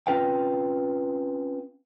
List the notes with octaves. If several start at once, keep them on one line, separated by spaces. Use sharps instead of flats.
C4 C#4 F4 B4 F5 G5